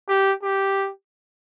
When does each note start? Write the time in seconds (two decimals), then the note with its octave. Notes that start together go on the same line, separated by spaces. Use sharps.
0.08 G4
0.43 G4